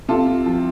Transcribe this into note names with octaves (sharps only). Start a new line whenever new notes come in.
C3 F4 A4
F3